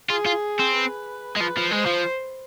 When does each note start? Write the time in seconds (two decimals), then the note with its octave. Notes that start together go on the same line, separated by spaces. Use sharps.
0.10 F4 G#4
0.26 F4
0.59 C4
0.75 B4
1.37 G#3
1.41 F3 B4
1.57 F3
1.71 G#3 C5
1.86 F3